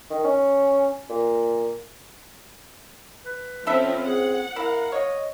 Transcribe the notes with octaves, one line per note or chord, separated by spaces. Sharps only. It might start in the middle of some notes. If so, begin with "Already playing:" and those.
D#3
C#4
A#2
B4
F3 C4 C#4 A4 E5 B5
C4 G#4 F#5
E4 A#4 F5
C#5 D#5